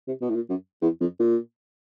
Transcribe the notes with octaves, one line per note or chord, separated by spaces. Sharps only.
C3
B2
A2
A#2
F#2
E2
F2
A#2